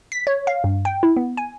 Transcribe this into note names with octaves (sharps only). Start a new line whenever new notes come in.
B6
C#5
F5
G2
G5
E4
B3
G#5